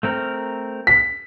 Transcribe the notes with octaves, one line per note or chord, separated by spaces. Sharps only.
A3 C4 A#4
B6